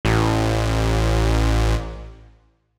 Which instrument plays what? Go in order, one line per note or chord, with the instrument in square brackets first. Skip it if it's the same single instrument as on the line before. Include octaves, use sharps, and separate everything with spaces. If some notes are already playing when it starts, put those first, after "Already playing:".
[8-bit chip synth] A1 [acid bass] A2